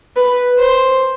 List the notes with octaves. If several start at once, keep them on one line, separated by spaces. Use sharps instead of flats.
B4
C5